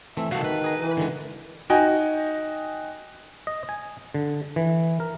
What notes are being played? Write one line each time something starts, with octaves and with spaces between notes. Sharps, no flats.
E3 A3 C4 E5
C2 D#3 F#4 A4 F5
B4
G#4 A#5
E3
D3 D#3 G#3
D#4 F#4 D#5 G5 G#5
D#5
G#5
D3
E3
A#4